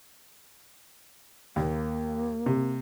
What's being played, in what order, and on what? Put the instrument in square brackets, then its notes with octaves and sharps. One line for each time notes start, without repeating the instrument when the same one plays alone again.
[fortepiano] D#2 [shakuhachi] A#3
[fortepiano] C3